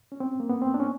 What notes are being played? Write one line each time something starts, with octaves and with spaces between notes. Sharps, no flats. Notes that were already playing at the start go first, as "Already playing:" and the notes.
C#4
C4
A#3
B3
C4
D4
C#4